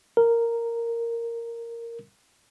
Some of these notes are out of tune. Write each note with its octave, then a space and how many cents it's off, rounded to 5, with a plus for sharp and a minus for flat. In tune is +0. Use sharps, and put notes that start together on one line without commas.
A#4 -5